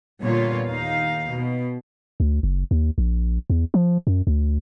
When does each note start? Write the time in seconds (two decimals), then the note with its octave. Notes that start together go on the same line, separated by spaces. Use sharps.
0.22 A#2 D3 G3 B3 F4 C#5
0.69 D#2 D#4 F5
1.31 B2
2.20 D2
2.43 F#1
2.71 D#2
2.98 A#1
3.50 E2
3.74 F3
4.07 F#2
4.27 D2